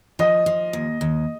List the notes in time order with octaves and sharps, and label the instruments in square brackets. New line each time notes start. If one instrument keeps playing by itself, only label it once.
[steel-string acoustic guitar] F3 [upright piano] D#5
[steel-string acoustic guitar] F3
D#2
D#2